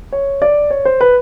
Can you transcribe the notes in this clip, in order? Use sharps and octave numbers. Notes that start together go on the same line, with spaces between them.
C#5
D5
C#5
C5
B4